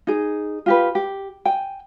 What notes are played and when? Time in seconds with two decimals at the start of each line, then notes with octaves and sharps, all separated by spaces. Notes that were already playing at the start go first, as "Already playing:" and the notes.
0.07 D#4 G#4
0.66 F4 G4 B4
0.95 G4
1.45 G5 G#5